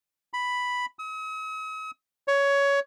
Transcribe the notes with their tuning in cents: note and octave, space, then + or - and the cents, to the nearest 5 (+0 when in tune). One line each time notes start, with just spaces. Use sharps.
B5 +0
D#6 +45
C#5 +15